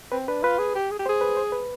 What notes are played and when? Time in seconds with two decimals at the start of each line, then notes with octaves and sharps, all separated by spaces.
0.12 C4 B4
0.28 D4 B4
0.43 F4 B4
0.58 G#4
0.75 G4
0.91 G#4
0.99 G4
1.06 C5
1.09 G#4
1.21 B4
1.37 C5
1.52 B4